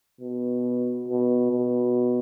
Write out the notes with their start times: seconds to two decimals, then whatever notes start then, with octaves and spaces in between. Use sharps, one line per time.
0.21 B2
1.08 B2
1.51 B2